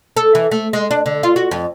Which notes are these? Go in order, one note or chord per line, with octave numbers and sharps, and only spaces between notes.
A4
E3
A3
G#3
D4
D3
F4
F#4
F2